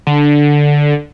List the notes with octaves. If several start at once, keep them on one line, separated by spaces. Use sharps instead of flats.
D3